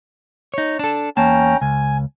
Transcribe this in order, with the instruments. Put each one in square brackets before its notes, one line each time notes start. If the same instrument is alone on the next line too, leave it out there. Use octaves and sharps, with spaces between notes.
[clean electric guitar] D#4 C#5
D4 A4
[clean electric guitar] E2 A#3 A5 [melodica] C#4 G5 A#5
[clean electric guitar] C#2 [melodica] G#5